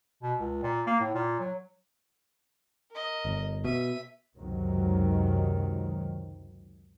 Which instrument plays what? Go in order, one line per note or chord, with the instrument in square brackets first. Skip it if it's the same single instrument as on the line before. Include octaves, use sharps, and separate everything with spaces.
[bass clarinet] B2
C#2
A#2
A#3
A2
A#2
F#3
[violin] A#4 D#5
[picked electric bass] G1
[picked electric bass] B2 [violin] E5 D#7
[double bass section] C#2 F#2 C3 D#3 F#3